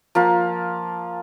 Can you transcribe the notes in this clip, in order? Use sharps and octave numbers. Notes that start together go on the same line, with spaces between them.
F3 A#3 F4